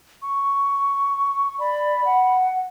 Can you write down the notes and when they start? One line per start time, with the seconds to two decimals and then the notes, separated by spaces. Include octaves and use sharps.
0.22 C#6
1.60 D5 B5
2.05 F#5